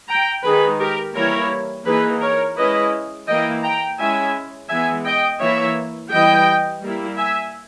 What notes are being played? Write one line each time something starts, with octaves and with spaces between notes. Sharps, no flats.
G5 A#5
D#3 G#3 D#4 G#4 B4
G4 A#4
E3 G3 A#3 E4 A#4 C#5
E3 A#3 D#4 G#4 B4
A#4 C#5
G#3 C#4 E4 B4 D#5
E3 A#3 E4 D#5 G5
G5 A#5
G#3 C#4 E4 E5 G#5
E3 G#3 B3 E5 G#5
D#5 G5
E3 A#3 E4 C#5 E5
E3 G3 B3 E4 D#5 G5
G3 A#3 E4
E5 G#5